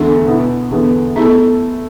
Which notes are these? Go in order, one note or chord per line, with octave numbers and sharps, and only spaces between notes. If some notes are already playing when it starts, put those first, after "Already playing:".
Already playing: E2 D3 A3 D4
B2 B3 E4
E2 D3 B3
A3 B3 E4 A4